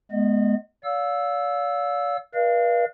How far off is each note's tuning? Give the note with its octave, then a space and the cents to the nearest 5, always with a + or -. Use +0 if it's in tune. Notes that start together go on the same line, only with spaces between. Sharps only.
G#3 +25 B3 -5 D#5 -40
D5 -45 F5 +25 E6 +0
B4 -45 D5 +40 F5 -25